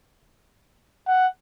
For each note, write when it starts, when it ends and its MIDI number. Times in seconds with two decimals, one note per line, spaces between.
1.08 1.27 78